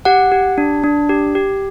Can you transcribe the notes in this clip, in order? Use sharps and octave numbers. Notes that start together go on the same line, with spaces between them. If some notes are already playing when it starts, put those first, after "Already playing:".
G4 F#5
G4
D4
D4
G4
G4